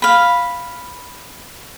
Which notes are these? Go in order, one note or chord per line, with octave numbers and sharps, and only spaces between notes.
F5 B5